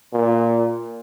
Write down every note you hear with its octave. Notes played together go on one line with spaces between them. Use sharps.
A#2